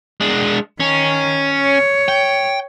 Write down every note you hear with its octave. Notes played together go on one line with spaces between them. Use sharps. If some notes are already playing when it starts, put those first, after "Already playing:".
G#3 D4
D#3 C#4
C#5
G5